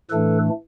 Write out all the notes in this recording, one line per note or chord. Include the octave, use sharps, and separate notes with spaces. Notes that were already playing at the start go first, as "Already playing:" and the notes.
A2 E3 A3 D4 A4 B4